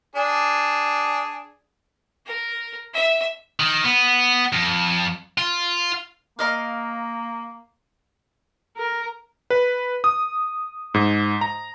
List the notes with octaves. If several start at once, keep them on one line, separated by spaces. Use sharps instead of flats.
D4 G#4
A#4
E5
D#3
B3
F2
F4
A#3 A#4 D#5 F5
A#4
B4
D#6
G#2
A#5